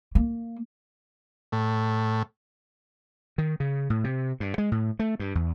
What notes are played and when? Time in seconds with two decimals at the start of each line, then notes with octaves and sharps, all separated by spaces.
0.15 A#3
1.52 A2
3.38 D#3
3.60 C#3
3.90 A2
4.04 C3
4.40 G2
4.58 G#3
4.72 A2
4.99 A3
5.20 G2
5.35 E2